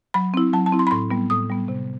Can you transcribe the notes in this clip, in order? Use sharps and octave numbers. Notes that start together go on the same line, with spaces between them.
F#3 B5
C4 E4
F#3 A5
A5
C4 E4
C6
B5
A2 C6
G3 B3
A2 D#6
G3 B3
C3